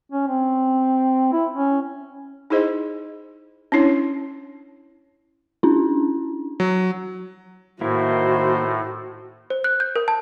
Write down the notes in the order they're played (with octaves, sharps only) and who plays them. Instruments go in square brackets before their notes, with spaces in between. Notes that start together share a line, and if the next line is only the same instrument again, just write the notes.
[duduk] C#4
C4
E4
C#4
[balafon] D#4 E4 G#4 C5 D#5
C#4 D4 E4 C#5
[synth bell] C#4 D4 E4
[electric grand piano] F#3
[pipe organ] A2 [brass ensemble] D#3 C5 [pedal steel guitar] A#3 E4 [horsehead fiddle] F#4
[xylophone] C5
F#6
G6
A#4
A5